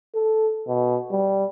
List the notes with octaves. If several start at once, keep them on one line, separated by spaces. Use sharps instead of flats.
A4
B2
G3